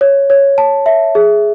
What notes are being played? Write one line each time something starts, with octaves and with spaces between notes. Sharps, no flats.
C#5
C#5
A5
E5
G#4